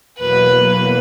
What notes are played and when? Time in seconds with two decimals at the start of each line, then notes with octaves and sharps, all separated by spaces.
0.18 E2 B2 F#3 A#3 B4
0.69 B4